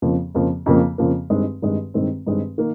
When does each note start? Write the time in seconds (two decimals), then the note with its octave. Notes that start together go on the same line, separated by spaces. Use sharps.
0.02 F2 C#3 F3 A#3
0.35 F2 C#3 F3 A#3
0.66 F2 C#3 F3 A#3
0.98 F2 C#3 F3 A#3
1.30 G2 D#3 G#3 C4
1.62 G2 D#3 G#3 C4
1.94 G2 D#3 G#3 C4
2.26 G2 D#3 G#3 C4
2.58 D#3 A#3